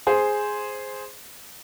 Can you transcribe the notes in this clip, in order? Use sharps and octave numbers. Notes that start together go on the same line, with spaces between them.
G#4 C5